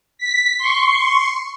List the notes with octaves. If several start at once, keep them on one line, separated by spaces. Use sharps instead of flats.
B6
C6 C#6